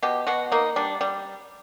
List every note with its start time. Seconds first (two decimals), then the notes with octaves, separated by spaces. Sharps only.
0.03 B2 G4
0.27 B2 F#4
0.52 A#3 D#4
0.76 G3 D4
1.01 G3